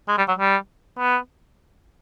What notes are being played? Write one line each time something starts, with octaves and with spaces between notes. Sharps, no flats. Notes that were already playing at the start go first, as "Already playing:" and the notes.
G#3
G3
F#3
G3
B3